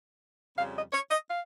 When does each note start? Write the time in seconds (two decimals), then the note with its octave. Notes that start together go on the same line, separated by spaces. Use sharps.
0.57 F2 C#3 G3 F5
0.75 D#5
0.93 C#5
1.11 D#5
1.29 F5